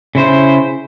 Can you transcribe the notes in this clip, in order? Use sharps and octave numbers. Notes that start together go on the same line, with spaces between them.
C#3 E4 C5